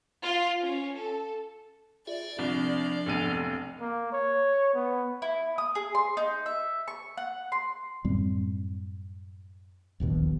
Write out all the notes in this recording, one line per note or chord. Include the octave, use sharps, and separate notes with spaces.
F4
C#4
A4
F4 G#4 D5 E5
C2 F3 C4 D4
F1 B1 D#7
A#3
C#5
B3
E4
D#6
G#4
C6
D#4
E5
C#6
F#5
C6
F#2 A2 G3 C4
D1 A#1 D#2 B2